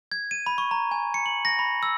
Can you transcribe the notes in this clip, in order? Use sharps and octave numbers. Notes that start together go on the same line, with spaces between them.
G#6
D#7
B5
C#6
A#5
G#5
C#7
F#7
A#6
B5
E6